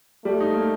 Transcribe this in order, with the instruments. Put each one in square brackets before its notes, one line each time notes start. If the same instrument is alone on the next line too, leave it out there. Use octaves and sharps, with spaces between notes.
[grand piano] G3 [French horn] A3
[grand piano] D#4
A#3